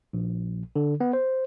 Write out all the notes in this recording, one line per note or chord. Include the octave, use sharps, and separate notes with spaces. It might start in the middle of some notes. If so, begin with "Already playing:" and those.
A#1
D3
B3
C5